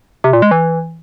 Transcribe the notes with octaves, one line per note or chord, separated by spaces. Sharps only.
C3
A#2
G#3
E3